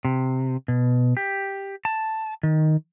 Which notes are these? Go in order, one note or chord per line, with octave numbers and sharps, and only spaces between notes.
C3
B2
G4
A5
D#3